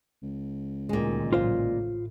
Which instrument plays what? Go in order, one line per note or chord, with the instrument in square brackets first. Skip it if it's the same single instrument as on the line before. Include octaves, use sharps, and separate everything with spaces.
[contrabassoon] C#2
[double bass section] D2 D#3 [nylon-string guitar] A#2 G#3
[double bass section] A1 F#3 [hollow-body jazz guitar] F4 C5 F5
[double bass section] A2